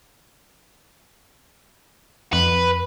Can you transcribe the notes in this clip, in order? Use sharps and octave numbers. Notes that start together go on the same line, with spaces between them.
F2 B4